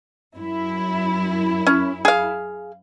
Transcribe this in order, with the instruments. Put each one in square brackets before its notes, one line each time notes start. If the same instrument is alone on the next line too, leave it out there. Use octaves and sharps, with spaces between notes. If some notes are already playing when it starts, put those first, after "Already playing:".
[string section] F#2 E4
[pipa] C#4
G#4 F5